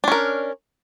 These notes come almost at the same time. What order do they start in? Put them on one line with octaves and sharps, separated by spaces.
D4 C#4 A#4